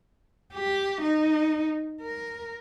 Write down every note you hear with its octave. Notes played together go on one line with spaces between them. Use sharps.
G4
D#4
A#4